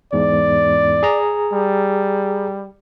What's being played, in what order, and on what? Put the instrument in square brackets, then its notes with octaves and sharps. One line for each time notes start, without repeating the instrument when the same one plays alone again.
[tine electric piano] E2 G#2 [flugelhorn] D5
[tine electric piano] G#4 A#5
[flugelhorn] G3